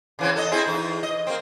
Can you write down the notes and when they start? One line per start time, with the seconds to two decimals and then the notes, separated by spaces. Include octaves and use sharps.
0.19 C#3 E3 C4
0.36 A4 D#5
0.52 C4 E4 G#4
0.67 E2 D#4
1.03 D#5
1.27 A#3 C4